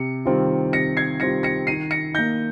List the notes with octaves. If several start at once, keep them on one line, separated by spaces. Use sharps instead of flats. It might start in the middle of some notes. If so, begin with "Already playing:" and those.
Already playing: C3 C#7
D#3 G3 C4 F4
C3 A#6 C#7
G#6 C7
D#3 G3 C4 F4 A#6 C#7
A#6 C#7
D#3 C7 D#7
A#6 C#7
A#3 D#4 G6 A#6